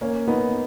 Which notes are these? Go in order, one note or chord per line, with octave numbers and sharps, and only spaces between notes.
A#3 C#4
B3 D#4